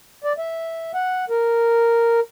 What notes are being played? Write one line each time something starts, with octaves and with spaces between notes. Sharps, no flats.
D5
E5
F#5
A#4